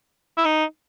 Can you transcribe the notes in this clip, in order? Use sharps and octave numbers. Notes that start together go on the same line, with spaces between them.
E4
D#4